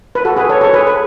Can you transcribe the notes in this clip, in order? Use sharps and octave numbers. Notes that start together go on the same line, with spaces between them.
B4
F#4 A4
G#4 B4
A4 C#5
A4 C#5
G#4 B4
B4